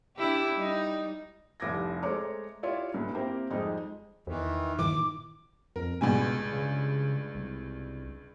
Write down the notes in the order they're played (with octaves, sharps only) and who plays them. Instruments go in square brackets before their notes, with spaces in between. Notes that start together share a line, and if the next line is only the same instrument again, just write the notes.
[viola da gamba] D4 E4 G4
G3 D#4
[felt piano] F1 C2 D6 G#6 A#6
G#3 A3 C5 C#5 A#5 D6
E4 F4 G4 C#5 D5 E5
B1 G2 A#2
A#3 C4 E4 G4 A#4 C5
F2 G3 G#3 D#4 G4 C5
[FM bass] E2 [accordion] D#3 E3
[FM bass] G2 [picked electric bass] A#2 D#3 E3 [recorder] D6
[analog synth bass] F2 [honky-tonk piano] A#4
[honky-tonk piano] C#2 G2 G#5 [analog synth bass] B2
[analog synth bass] C#3
C2